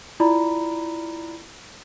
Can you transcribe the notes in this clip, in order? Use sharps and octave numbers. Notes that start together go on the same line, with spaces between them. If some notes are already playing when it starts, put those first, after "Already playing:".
E4 F4 D5 A#5 B5